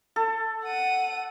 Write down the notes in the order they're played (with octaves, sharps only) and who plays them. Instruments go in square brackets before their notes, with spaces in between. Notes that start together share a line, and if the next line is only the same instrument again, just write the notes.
[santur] A4
[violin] F#5 D#7